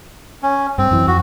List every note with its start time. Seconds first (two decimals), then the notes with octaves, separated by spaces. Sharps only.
0.43 C#4
0.78 G2 C4
0.91 F#2 E3
1.07 F2 F#4